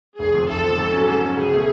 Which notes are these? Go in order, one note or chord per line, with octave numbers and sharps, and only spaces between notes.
F1 G#4
F2 F3
F1 A4
F2 F3
G#2
F#3 C#4
G#2 A4
F#3 C#4
C#2 G#4
B2 A3 C#4